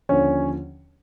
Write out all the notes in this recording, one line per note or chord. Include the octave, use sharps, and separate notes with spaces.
D#2 D3 F3 C#4 C#5